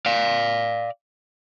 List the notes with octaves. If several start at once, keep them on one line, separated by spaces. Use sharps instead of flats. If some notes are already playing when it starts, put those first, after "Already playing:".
D5 F5